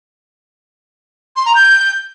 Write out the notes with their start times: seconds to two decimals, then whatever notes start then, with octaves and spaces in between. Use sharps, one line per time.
1.36 C6
1.46 A#5
1.55 G6